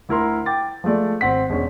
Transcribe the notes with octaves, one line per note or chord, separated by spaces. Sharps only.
D2 E4 A#4 C6
G5 D6 A6
F3 G#3 A3 D5
G#1 C4 F#5 B6
E1 G#3 C#4